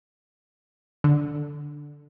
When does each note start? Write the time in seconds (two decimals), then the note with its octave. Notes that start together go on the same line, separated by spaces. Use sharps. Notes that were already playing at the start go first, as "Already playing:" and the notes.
1.04 D3